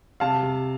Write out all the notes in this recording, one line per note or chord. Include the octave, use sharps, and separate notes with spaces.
C3 F5 A5
C3